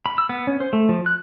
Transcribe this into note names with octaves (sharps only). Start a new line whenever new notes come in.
B5
E6
B3
C#4
C5
A3
F3
F#6